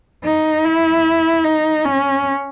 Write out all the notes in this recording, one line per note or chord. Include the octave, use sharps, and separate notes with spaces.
D#4
E4
D#4
C#4